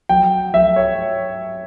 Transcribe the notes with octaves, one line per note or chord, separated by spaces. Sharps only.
F#3 G5
F#3 E5
C#5